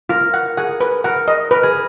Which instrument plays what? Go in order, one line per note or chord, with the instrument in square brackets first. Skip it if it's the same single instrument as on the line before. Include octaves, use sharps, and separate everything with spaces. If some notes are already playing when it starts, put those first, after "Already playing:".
[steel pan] F4 [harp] A#4
[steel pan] F#5
[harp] G#4 [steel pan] F#5
[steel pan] B4
[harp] A#4 [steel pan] F#5
[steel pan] D#5
[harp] A#4 [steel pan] B4
[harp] G#4